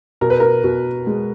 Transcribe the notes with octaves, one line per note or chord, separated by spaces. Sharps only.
B2 A#4
B4
A#4
B2
G#3